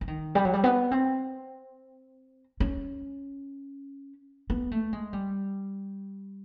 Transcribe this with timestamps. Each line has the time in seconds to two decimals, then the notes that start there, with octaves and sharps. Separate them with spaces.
0.01 E3
0.08 D#3
0.35 G3
0.45 F#3
0.53 G3
0.64 B3
0.91 C4
2.60 C#4
4.50 B3
4.71 A3
4.93 G#3
5.13 G3